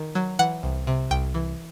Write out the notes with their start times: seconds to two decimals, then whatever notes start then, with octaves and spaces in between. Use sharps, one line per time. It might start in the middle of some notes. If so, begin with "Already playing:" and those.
Already playing: D#3
0.15 F#3
0.39 E3 F#5
0.63 C2
0.87 C3
1.11 C2 G5
1.34 E3